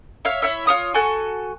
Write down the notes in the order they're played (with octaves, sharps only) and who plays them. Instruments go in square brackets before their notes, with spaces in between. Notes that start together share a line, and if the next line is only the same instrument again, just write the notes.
[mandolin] C#5 E5 F5
E4 C#5 E5
F4 C#5 D#6
F#4 A4 G#5 C#6